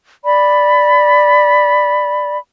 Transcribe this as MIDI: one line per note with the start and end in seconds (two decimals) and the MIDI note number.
0.24 2.36 74
0.24 2.36 83